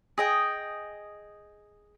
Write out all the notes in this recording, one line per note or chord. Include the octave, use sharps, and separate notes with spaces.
G#4 D#5 G5